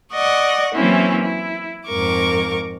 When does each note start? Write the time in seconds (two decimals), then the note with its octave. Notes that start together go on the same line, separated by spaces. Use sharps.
0.13 D5 D#5 F#5 C#6
0.74 E3 F#3 A#3 C4 C#4 E4
1.23 E4
1.87 F2 G#2 A#4 C#6 D6